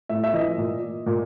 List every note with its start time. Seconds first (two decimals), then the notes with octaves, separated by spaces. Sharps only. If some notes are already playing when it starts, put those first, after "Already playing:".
0.09 A2 E5
0.24 E5
0.33 E3 D#5
0.58 A#2
1.06 A#2